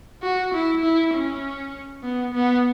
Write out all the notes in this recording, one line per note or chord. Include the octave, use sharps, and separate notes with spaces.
F#4
E4
E4
C#4
B3
B3